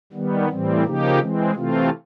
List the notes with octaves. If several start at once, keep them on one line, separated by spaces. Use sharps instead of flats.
D#3 G3 B3
A2 E3 G3 C4
C#3 F3 A#3 D#4 G4
E3 G#3 C4
C3 E3 A3 C4 F4